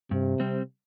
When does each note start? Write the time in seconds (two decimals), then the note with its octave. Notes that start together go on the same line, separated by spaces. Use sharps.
0.11 G2 C3
0.40 G3 C4